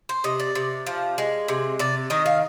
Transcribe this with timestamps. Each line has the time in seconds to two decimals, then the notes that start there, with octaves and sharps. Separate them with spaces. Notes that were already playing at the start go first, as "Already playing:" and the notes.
0.09 C5
0.24 C3 D#5
0.40 D5
0.55 C3
0.87 F3
1.18 G#3
1.48 C3
1.79 C3 D5
2.10 D#3 D#5
2.26 F5